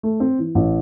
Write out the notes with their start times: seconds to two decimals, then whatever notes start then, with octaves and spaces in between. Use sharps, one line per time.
0.03 A3
0.20 C4
0.39 E3
0.55 A1